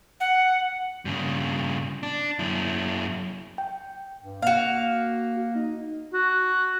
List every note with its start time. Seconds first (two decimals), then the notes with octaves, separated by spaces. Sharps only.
0.20 F#5
1.05 G2 C#3
2.03 D4
2.39 F#2 E4
3.58 G5
4.23 G2
4.42 A#3 F#4 F5
5.55 D#4
6.14 F#4